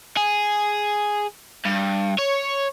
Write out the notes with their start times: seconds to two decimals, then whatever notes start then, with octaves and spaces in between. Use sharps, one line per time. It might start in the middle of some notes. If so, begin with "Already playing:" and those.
0.17 G#4
1.65 G2
2.18 C#5